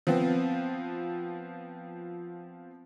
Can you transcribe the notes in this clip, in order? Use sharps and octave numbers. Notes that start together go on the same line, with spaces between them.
F3 B3 C4